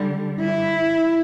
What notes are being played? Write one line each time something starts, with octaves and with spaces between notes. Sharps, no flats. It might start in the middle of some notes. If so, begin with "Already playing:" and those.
Already playing: D3 G3
E4